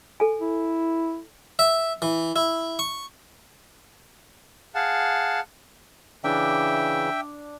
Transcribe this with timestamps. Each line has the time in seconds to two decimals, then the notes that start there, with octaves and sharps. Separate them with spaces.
0.20 A4 G#5
0.41 E4
1.59 E5
2.02 E3
2.36 E4
2.79 C#6
4.75 G#4 F5 F#5 A5
6.24 C#3 E3 D4 E5 G5